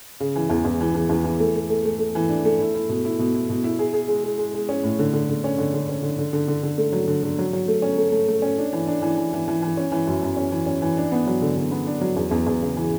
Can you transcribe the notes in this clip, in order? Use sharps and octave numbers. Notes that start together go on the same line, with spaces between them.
C#3
E3
E2
E2
E3
E3
E2
E3
A3
A3
A3
A3
A3
E3
D4
A3
E4
E4
B2
E4
B2
E4
B2
E4
G#4
G#4
G#3
G#3
G#3
G#3
C#4
A2
D3
D3
D3
C#4
D3
D3
C#4
D3
D3
D3
D3
D3
A3
F#3
D3
D3
F#3
F#3
A3
C#4
A3
A3
A3
C#4
D4
E3
D4
E3
E3
E3
E3
E3
C#4
E3
F#2
F#2
C#4
E3
C#4
E3
D4
B3
F#3
D3
D3
B3
D4
F#3
E2
E2
E2
C#3
E3